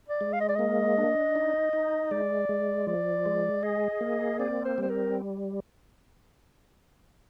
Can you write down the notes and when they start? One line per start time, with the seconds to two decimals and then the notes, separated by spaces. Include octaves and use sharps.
0.08 D5
0.21 G#3
0.33 F5
0.41 D#5
0.49 D5
0.55 A#3 D#5
0.98 D4
1.36 D#4
1.73 D#4
2.11 G#3 D5
2.49 G#3
2.87 F3 D5
3.26 G#3
3.63 G#4 D#5
4.01 A#3
4.39 C4 D5
4.65 C5
4.78 G3 C5
4.90 A#4